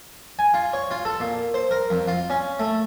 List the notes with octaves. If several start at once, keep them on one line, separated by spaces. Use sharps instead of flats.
G#5
F4
C#5
F4
A4
A#2
C5
A#4
F2
F4
C#4
A3